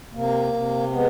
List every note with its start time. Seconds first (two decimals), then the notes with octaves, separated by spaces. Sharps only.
0.13 C3 A#3
0.53 C3
0.92 G#3 B3